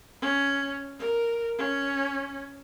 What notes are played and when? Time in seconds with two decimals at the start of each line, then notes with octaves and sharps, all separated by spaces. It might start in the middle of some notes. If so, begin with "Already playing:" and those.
0.21 C#4
0.99 A#4
1.58 C#4